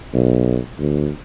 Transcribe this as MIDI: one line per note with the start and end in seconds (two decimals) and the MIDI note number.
0.14 0.59 35
0.79 1.10 38